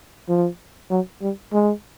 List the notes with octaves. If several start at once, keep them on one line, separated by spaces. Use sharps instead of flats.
F3
F#3
G3
G#3